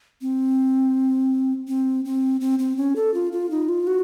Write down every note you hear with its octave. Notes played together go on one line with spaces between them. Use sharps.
C4
C4
C4
C4
C4
C#4
A4
F4
F4
D#4
F4
F#4